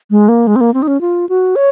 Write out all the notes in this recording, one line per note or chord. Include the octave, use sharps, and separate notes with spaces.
G#3
A#3
G#3
C4
A#3
C4
D#4
C#4
F4
F#4
C#5